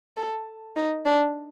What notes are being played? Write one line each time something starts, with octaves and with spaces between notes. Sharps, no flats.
A4
D#4
D4